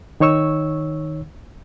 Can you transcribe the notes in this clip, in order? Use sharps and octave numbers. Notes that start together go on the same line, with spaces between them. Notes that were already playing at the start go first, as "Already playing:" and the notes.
D#3 D#4 C#5 C#6 E6